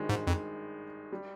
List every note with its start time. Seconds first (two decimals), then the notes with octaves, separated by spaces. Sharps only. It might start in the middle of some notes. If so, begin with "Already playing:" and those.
Already playing: G#1 G2 D#3 G#3
0.09 G#2
0.27 F2
1.12 G3